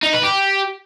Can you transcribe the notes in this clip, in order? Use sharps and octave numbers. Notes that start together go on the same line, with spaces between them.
D#4
B4
G4